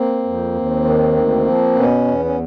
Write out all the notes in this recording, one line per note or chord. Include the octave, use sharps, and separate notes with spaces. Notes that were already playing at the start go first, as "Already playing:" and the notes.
Already playing: A#3 C4
F2
D#2
D#3
D2
F3
B2 B3 C#4
E2
C#4